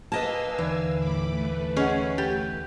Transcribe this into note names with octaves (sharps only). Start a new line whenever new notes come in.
A#3 B4 D#5 F5 G#5 A5 E6
D#2 D3 E3
A2 B5 D6
A3 B4
C#4 G#4 C#5 D#5 F#5
G4 A6